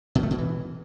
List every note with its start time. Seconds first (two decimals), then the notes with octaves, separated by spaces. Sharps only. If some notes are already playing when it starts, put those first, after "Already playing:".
0.15 B2
0.23 A3
0.31 B2
0.38 E3